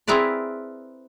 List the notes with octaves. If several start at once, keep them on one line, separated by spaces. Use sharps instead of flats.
C4 E4 G#4 A#4 B4 D5